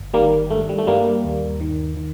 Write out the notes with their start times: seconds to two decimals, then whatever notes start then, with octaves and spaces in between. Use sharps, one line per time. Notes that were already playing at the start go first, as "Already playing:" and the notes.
Already playing: G1
0.14 D#3 G3 A#3
0.50 G2 A3
0.69 G3
0.78 A3
0.87 G2 G3 A#3
1.24 D#2
1.60 D#3
1.97 D#3